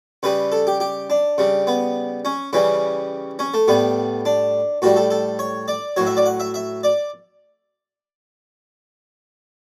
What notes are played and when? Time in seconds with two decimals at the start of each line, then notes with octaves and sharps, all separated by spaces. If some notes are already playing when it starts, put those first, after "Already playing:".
0.23 C#3 G3 B4
0.52 A4
0.67 G4
0.80 G4
1.10 D4
1.38 C#3 G3
1.67 B3
2.25 C#4
2.53 C#3 E3 G3 C#4
3.39 C#4
3.54 A3
3.68 A2 G3 B3
4.25 D4
4.82 A2 G3 F#4
4.96 A4
5.10 A4
5.39 C#5
5.68 D5
5.96 A2 F#3 C#5
6.07 E5
6.17 D5
6.26 F#5
6.40 E5
6.54 E5
6.84 D5